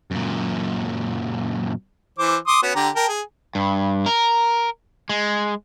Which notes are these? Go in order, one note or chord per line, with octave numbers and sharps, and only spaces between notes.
F#2 A#2
E3 C5 D6
C6 D6 D#6
B3 C#4 F#4
D3 G4 A#5
A#4 G5 A5
G#4
G2
A#4
G#3